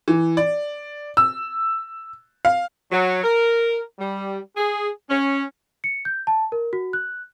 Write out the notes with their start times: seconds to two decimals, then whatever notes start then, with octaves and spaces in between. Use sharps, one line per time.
0.08 E3
0.37 D5
1.17 E6
2.45 F5
2.92 F#3
3.23 A#4
3.99 G3
4.56 G#4
5.10 C#4
5.84 C#7
6.05 G6
6.27 A5
6.52 A#4
6.73 F#4
6.93 F#6